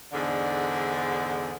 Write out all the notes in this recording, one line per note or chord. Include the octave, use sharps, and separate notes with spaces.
E2 G#2 D3